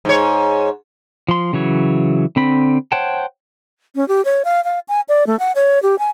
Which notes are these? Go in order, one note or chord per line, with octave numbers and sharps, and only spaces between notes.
G#2 C#5
F3 C6
C#3 E3 F#3 C#5
D3 C4 B5
C5 C#5 F#5 G5 A5
C#4
G4
C#5
F5
F5
G#5
D5
A3
F#5
C#5
G4
G#5